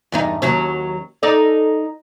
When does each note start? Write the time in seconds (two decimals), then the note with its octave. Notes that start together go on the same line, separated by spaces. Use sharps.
0.12 E2 G2 D#4
0.42 D#2 F#3 C#4
1.23 D#4 A4 D5